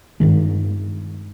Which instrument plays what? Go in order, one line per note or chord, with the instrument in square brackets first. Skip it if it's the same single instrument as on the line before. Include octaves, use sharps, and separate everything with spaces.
[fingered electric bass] G2 D#3 G#3